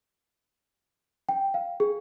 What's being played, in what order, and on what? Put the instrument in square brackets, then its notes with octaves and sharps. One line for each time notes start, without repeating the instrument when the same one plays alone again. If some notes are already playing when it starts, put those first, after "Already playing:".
[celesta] G5
F5
G#4